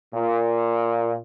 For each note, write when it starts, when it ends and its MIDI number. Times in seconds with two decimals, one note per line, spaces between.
0.14 1.16 46